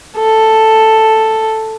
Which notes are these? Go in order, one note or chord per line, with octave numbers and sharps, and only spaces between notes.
A4